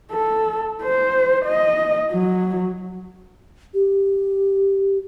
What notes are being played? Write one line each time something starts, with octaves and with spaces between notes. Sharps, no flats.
A4
C5
D#5
F#3
G4